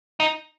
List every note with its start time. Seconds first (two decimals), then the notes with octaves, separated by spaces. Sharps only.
0.20 D#4